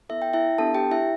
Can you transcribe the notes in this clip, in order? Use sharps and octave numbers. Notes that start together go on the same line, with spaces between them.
B3 E4 A4 E5
G5
E4 E5
B3 D4 G4 A4 A5
G4 G5
E4 E5